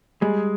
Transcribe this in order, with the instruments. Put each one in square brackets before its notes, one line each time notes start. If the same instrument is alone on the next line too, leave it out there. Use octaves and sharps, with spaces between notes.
[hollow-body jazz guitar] G3 [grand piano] G#3 G#4